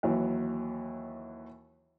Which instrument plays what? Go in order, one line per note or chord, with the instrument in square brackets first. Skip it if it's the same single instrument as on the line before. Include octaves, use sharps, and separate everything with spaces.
[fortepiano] D#2 E3 F#3